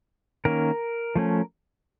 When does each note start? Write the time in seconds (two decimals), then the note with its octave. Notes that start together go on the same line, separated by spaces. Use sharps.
0.45 D#3 A#3 C#4 A#4
1.16 F3 A3 C#4